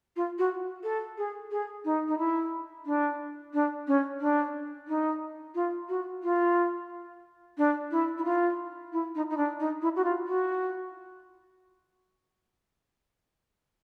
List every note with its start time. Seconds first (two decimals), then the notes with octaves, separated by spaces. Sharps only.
0.16 F4
0.39 F#4
0.83 A4
1.18 G#4
1.51 G#4
1.85 D#4
2.08 D#4
2.18 E4
2.86 D4
3.53 D4
3.87 C#4
4.20 D4
4.88 D#4
5.55 F4
5.89 F#4
6.23 F4
7.58 D4
7.91 E4
8.18 E4
8.25 F4
8.93 E4
9.15 D#4
9.30 D#4
9.37 D4
9.60 D#4
9.82 E4
9.96 F#4
10.04 F4
10.27 F#4